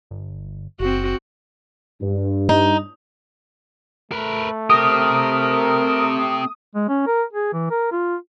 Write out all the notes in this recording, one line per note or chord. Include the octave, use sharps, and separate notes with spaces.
G1
F#1 C4 F#4
G2
D#4
A3 A#4 B4
C4 G4 A#4 D#6
G#3
C#4
A#4
G#4
E3
A#4
F4